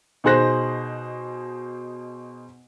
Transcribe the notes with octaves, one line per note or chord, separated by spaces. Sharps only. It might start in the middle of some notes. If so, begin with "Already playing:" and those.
B2 D#4 G#4 C5 F#6 A#6